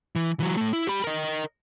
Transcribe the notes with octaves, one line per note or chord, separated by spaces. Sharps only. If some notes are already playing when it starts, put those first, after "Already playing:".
E3
E3 F#3
A2 A3
E4
G4 B5
A#4 D#5